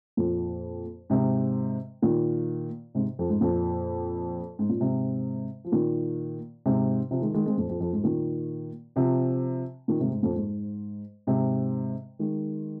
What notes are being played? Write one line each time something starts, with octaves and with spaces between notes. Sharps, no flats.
F2 A#2
G#2 C3
A#2 D#3
G#2 C3
F2
G#2
F2 A#2
G#2
A#2
G#2 C3
F3
A#2 D#3
G#2 C3
C3 F3
D#3 G#3
D#3 G#3
G#3 C4
F2 A#2
F2
F2
G#2
A#2 D#3
C3 F3
A#2 D#3
G#2 C3
G#2
F2 A#2
G#2
G#2 C3
D#3 G#3